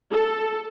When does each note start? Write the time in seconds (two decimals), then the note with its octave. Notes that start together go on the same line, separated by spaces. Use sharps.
0.12 A4